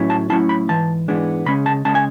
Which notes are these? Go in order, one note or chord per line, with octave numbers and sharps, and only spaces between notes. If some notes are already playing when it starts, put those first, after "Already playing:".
Already playing: A2 F#3 C#4 E4
A5
A2 F#3 C#4 E4 A5
B5
G#2 E3 A5
G#2 E3 G#3 B3 D4
C#3 G#3 C#4 B5
A5
C#3 G#3 C#4 A5
G#5